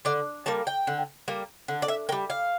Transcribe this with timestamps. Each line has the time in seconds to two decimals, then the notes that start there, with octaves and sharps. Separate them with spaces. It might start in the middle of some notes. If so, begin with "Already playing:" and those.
0.05 D3 D5
0.46 G3 A#3 A5
0.67 G5
0.87 D3
1.28 G3 A#3
1.68 D3
1.82 D5
1.88 E5
2.09 A#3 G5
2.12 G3
2.30 F5